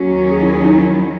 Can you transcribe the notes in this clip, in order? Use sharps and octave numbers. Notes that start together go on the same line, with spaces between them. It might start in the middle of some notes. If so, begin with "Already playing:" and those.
Already playing: D#2 D#3 F#3 C#4 F#4
G#4
E4
G#4
D#4
E4